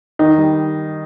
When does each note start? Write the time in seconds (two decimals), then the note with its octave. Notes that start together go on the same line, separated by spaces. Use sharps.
0.19 D#3 D#4
0.38 G3